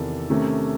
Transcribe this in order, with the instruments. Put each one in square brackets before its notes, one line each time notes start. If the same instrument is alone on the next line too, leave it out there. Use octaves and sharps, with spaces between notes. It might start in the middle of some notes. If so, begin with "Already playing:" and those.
Already playing: [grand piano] E2 C3 D#3 A4
C3 D#3 A3 C#4